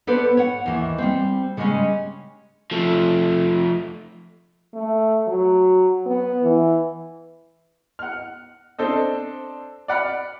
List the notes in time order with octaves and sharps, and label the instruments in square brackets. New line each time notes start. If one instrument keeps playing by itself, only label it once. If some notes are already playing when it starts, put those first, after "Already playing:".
[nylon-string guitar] B3 A4 B4 C5 D5
C#5 F#5
D#2 E3
G3 C4
C#3 G3 G#3 A#3 C#4
[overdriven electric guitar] F3 A3
[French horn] A3
F#3
B3
E3
[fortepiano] F#5 F6
C4 D4 A4 C5 D#5
D5 F#5 B5 F6